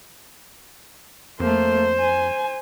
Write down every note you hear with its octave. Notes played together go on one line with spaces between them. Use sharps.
F2 A3 A#3 C5
G#5